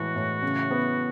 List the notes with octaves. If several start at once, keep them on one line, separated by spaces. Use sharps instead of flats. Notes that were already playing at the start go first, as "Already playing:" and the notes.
Already playing: A2 E3 G#3 F#4
A2
C#3
B3